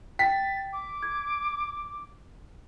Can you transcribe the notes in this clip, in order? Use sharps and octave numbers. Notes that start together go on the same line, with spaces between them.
G5 A6 B6
D6
G#6